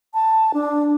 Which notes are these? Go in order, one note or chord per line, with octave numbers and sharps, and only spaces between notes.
A5
D4